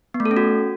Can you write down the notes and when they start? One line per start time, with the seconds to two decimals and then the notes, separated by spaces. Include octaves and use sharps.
0.14 B3
0.20 A3
0.25 A4
0.31 C#4
0.37 F#4